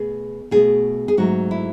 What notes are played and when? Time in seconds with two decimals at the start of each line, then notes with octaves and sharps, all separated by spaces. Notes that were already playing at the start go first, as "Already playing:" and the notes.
Already playing: B2 A3 G#4
0.51 B2 A3 G#4
1.08 G#4
1.17 G#2 F#3 A3 F#4
1.51 E4